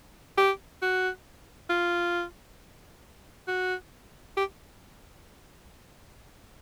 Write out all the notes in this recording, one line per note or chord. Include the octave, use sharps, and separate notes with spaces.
G4
F#4
F4
F#4
G4